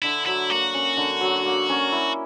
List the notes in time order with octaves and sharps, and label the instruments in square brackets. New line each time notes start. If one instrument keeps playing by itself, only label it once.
[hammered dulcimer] D3 [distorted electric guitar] E4
[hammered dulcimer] F#3 [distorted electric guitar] E4
[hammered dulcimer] A#3 [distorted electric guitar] F#4
[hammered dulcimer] C#4
D3
F#3
A#3
C#4
E4